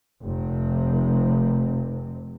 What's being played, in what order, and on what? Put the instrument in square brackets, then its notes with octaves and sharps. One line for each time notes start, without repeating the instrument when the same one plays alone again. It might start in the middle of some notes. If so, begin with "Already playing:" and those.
[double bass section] F1 C3